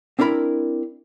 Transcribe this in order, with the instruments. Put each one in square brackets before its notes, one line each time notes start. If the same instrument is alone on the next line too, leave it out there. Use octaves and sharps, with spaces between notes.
[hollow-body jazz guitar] C4 D4 E4 A#4 B5